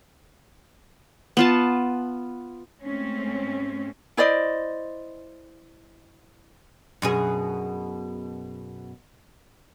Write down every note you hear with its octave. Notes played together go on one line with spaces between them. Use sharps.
B3 F4 A5
G#2 A3 C4 C#4
E4 C5 D5 D#5
F#2 B2 G#4